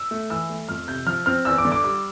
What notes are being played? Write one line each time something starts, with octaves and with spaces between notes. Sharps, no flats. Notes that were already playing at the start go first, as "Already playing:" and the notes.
Already playing: E6
A3
E3 E6
A3
F2 F6
C3 G6
F3 F6
C4 F6
E2 E6
D6
D3
D6
G3 D6